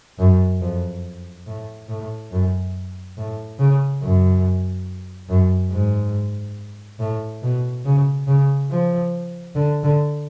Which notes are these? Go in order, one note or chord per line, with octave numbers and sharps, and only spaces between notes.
F#2
F2
A2
A2
F#2
A2
C#3
F#2
F#2
G#2
A2
B2
C#3
C#3
F3
D3
D3